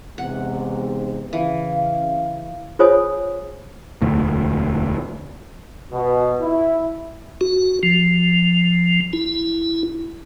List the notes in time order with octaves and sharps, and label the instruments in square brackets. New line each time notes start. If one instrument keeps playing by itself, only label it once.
[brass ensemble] E2 G#2 C3 [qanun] F#5
[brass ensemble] C#3 F5 [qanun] E3
[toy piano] F4 G#4 C5 C#5 G#5 D#6
[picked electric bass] E1 D2 A2
[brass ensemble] B2
E4
[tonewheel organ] F#4
F3
E4